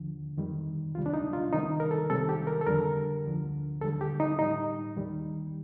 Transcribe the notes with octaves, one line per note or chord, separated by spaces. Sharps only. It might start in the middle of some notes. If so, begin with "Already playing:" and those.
Already playing: D#2 D3 F3
F2 D#3 G3
D2 C3 G3 F4
D4
D#4
F4
C2 C3 D#3 G3 D#4
A#4
A4
C2 C3 D#3 G3 A4
G4
A#4
A4
F2 D3 G3 A#4
D2 D3 F3
D#2 D3 G3 A4
G4
D#4
A2 G3 D#4
D#2 D#3 G3